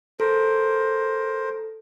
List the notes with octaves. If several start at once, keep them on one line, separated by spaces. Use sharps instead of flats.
A4 A#4 C5